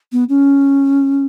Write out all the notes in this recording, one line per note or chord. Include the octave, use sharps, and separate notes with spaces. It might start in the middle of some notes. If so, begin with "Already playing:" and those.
B3
C#4